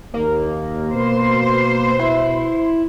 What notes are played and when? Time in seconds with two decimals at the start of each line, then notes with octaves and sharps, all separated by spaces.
0.14 D#2 A#3
0.93 B2 B4 C5
1.99 E4